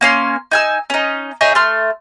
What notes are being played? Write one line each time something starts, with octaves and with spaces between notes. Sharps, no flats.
A#3 C#4 C6
D#4 G#5 E6
C#4 D#4
D#4 G#4 C#5 E5
A3 C6 F6